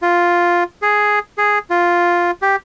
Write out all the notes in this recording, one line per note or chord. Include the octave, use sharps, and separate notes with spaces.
F4
G#4
G#4
F4
G4